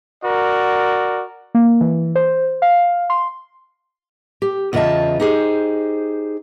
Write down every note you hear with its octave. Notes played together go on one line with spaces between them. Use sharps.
F#4 A#4 D5
A#3
E3
C5
F5
C6
G4
E2 C#3 F4 D#5 E5 A5
D#4 G4 G#4 C5